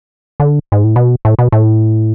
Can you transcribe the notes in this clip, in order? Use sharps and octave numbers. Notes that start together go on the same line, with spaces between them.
D3
G#2
A2
B2
A2
B2
A2